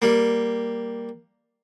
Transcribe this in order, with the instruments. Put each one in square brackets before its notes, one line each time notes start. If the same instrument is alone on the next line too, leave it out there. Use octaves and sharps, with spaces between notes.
[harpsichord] G3 A#3